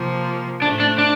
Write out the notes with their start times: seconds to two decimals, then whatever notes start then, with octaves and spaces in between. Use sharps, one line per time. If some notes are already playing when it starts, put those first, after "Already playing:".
Already playing: C3 F3 A#3
0.62 A2 A3 C4 D4
0.80 D4
0.98 D4